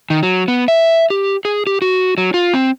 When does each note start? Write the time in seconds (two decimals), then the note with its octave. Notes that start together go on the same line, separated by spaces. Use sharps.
0.10 D#3
0.23 F#3
0.48 B3
0.68 E5
1.10 G4
1.45 G#4
1.67 G4
1.82 F#4
2.18 F#3
2.34 F4
2.54 C4